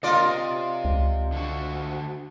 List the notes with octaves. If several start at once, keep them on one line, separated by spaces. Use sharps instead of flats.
D3 A#3 F4 A#4 D5 D#5
C4 G4
C#2
D3 F#4